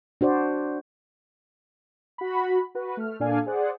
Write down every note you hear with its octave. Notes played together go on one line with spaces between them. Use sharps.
D4 F#4 C5 D5
F#4 B5
F#4 B4
A3 F6
A#2 D4 A4 D5 F5 G#5
G#4 C5 D5 F#5